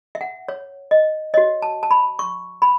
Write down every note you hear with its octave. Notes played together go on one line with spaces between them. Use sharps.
E5
F#5
C#5
D#5
F#4 C#5 D#5
A5
A5
B5
C#6
B5